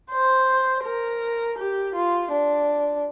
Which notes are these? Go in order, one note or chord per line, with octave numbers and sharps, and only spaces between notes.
C5
A#4
G4
F4
D4